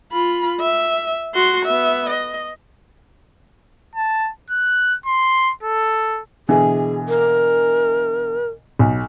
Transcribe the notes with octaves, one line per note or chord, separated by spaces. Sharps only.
F4 B5
E5
F#4 C6
B3 E5
D#5
A5
F#6
C6
A4
B2 D3 E3 G#4
A#4
B1